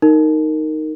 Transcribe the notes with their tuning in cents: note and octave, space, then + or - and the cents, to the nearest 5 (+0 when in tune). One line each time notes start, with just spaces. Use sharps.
D#4 +0 A#4 -15